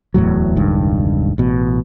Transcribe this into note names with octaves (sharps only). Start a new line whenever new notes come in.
D1 E2 A2 F#3
E1 C#2 G2 D#3
A1 B2